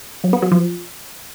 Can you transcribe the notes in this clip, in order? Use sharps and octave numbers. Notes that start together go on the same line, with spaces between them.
F#3
B3
F#3
F3